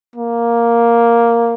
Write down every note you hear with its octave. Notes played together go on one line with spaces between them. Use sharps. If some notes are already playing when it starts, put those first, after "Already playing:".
A#3